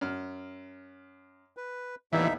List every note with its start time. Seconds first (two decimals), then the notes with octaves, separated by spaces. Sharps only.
0.01 F#2 F6
1.57 B4
2.13 D#2 A2 E3 G3 B3 D#4 E5